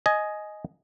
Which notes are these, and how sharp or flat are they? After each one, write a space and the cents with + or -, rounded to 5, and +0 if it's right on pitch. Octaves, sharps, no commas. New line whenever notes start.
D#5 +0 G#5 +15